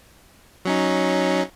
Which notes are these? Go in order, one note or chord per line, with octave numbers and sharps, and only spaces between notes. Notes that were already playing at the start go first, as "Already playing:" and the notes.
F#3 C#4 D#4